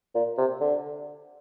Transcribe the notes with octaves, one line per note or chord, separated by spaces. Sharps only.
A#2
C3
D3